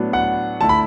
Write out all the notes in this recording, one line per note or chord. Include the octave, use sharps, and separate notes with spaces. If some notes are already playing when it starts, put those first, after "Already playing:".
Already playing: A2 F#3 B3 D4
F#5
D3 A3 E4 A5
B5